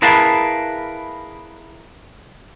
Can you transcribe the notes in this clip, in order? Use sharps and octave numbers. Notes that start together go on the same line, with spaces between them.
E4 G#4 A#4 B4 F5 A5